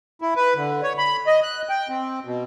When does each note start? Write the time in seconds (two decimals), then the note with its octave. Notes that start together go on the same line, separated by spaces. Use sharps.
0.22 E4
0.36 B4
0.55 D3
0.83 C#5
0.98 B5
1.27 D#5
1.43 F#6
1.69 G5
1.89 C4
2.25 B2